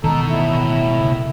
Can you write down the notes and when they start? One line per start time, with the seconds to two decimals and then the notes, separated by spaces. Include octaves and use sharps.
0.04 B2 D#3 E3 G#3 D#4 A4
0.30 A2 E4
1.01 C#3